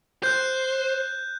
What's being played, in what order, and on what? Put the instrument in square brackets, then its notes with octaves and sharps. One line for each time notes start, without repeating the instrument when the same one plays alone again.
[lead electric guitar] C5 [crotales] F#6 G6